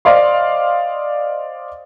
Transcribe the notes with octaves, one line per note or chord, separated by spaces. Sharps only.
C5 D5 D#5 F5 C6